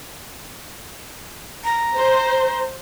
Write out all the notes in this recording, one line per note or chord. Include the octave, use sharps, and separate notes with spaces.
A#5
C5